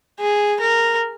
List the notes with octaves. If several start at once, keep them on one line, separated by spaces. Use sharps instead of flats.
G#4
A#4